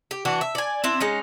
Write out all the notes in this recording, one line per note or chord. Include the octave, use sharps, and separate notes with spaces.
G4
E3 D4 F#4
E5
D5 G#5
C4 D4 E4
G#3 C#4 D#4